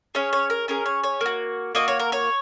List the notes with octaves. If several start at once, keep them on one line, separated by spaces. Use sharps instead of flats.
C#4 G#4 C#5
C#5
A#4
C#4 G#4 A#4
C#5
C#5
A#3 F#4
A#3 F#4 D#5
C#5
A#4
C#5